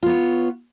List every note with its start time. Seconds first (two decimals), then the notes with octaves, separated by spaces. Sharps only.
0.03 F4
0.06 B3
0.09 C#5